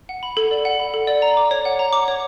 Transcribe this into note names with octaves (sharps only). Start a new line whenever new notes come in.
F#5
B5
A4
D5
F#5
B5
A4
D5
A#5
D6
C#5
F#5
A#5
D6
C#5